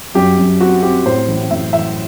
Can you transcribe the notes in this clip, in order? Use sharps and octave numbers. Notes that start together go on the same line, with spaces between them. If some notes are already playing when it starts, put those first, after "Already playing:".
F#2 G4
F#2
C4 F#4
C4 G4
A2 C5
A1
A2 E5
E3 E5